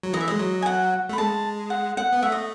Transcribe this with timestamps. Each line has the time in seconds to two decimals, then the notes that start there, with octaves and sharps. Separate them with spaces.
0.03 F#3
0.13 E3 D#5
0.21 E5
0.28 G#3 D#5
0.39 F#3
0.62 G#5
0.66 F#5
1.09 A3 B5
1.18 G#3 A5
1.70 F#5
1.97 F#5
2.13 B3
2.23 A3 E5
2.32 D#5